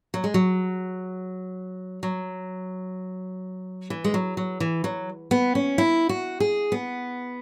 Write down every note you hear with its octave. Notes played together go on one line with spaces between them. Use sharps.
F#3
G#3
F#3
F#3
E3
G#3
F#3
F#3
E3
F#3
B3
C#4
E4
F#4
G#4
B3